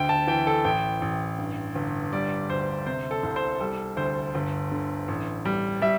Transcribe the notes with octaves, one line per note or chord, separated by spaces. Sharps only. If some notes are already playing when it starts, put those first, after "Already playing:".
Already playing: D2 G5
A5
E3 G5
A4
A1 G5
A1
G2
G1
G3 D5
D2 C5
C3 C5
A4
C2
C5
G3 A4
D2 C5
G1
D3
A1
G3
G3 E5